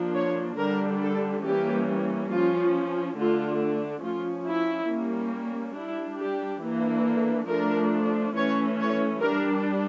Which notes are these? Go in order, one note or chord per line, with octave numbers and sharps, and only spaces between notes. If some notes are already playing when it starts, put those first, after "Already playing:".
Already playing: F3 A#3 D4
C#5
D3 G3 D4 A#4
A4
E3 G3 A#3 C#4 G4
F3 C#4 F4
D3 A3 D4 F4
F3 C#4 F4
E4
G3 A#3 C#4
G3 D4 E4
G4
E3 A#3 D4
A4
F3 A3 D4 A#4
E3 A3 C#4 C#5
C#5
G3 D4 A#4